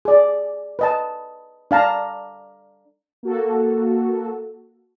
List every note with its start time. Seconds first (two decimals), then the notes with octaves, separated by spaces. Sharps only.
0.05 G#4 D5
0.79 B4 D#5 A5
1.71 D4 F5 A5 A#5
3.23 A#3 F#4 A4